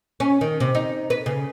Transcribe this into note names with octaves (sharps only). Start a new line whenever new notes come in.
C#4
D#3
C3
D#4
B4
C#3